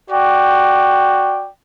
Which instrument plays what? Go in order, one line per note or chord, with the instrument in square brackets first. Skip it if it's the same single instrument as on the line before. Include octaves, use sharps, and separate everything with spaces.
[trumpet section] F#4 D5 G5